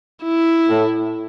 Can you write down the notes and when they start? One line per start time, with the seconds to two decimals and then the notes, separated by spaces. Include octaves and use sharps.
0.23 E4
0.68 A2